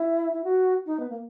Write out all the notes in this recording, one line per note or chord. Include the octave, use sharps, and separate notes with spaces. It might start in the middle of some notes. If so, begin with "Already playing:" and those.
Already playing: E4
E4
F#4
D#4
B3
A#3